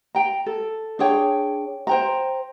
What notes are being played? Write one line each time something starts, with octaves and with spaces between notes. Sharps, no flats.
G5 A#5
A4
D4 G#4 C#5 G5
C5 G5 A#5